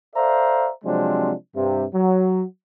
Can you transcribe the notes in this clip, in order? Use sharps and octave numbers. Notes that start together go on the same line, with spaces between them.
A4 C5 D5 E5 F5 A#5
C3 F3 F#3 G#3 C4 D4
G2 C3
F#3